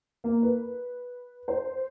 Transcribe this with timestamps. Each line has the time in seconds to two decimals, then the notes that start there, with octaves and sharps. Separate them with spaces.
0.24 A#3
0.42 B4
1.48 C5